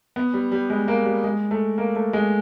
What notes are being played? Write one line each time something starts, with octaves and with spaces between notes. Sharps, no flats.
B3
G3
G3
G#3
A#3
G3
G#3
A3
A#3
A3
G#3